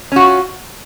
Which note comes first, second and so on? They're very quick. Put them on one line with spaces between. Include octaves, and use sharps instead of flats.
C#4 F#4 F4